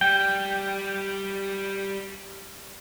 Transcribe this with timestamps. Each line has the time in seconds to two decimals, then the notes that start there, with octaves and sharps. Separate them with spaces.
0.01 G3 G5